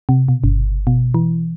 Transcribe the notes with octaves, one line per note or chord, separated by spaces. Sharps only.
C3
B2
G1
B2
E3